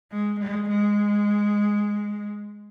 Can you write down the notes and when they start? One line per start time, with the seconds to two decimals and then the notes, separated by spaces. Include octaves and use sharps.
0.12 G#3
0.40 G#3
0.70 G#3